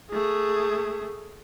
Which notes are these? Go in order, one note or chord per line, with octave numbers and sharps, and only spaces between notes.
A3 G#4